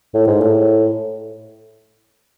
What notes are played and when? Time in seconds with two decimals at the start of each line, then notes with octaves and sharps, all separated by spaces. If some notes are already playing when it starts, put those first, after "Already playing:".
0.14 A2
0.27 G#2
0.41 A2